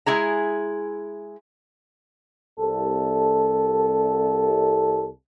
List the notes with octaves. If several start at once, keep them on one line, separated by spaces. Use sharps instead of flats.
G#3 E4 G#4 A#5
C2 A4